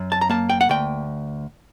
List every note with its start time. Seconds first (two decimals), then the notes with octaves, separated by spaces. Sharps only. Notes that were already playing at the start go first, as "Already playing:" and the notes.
Already playing: F#2
0.12 A5
0.21 A#5
0.29 A#3 A5
0.49 G5
0.61 F#5
0.69 D2 G5